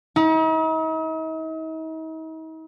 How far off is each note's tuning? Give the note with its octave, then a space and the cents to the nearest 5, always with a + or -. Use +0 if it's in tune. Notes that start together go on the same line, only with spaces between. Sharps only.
D#4 +45